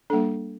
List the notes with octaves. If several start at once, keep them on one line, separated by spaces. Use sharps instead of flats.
G3 A#3 D4 A4